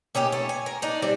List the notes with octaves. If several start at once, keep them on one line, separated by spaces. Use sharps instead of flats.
A#3 C#4 D#4 G4
A3
G#5
A#4
D4 D#4
G3 C4 D5